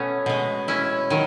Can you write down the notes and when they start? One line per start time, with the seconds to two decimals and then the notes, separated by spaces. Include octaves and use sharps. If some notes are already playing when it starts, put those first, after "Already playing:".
Already playing: B2 A3 B3 C#4
0.26 B2 G#3
0.68 C#4 E4
1.10 D#3 F#3